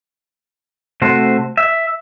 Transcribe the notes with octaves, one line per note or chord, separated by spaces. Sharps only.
C3 A3 F#4 C5
E5